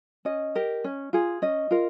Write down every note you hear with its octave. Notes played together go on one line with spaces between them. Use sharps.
C#4 D#5
G4 A#4
C#4
F4 G#4
C#4 D#5
F4 A#4